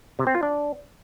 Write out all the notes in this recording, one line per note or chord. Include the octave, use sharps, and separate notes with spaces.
C3
C4
F4
D4